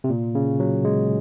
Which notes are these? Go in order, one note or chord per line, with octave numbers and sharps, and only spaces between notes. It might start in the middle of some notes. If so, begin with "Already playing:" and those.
C3
A#2
C#3
F#3
G#3